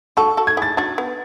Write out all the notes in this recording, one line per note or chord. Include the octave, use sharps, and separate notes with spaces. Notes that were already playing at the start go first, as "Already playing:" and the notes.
F#4 A4 C#6
F#4 A4
G#6
E4 G#4 A6
D4 F#4 A6
B3